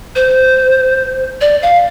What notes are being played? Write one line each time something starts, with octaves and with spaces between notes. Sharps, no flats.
C5
D5
F5